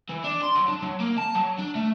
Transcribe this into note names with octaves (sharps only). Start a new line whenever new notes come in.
E3
D4
C6
F#3
D4
F#3
A#3
A5
F#3
D4
A3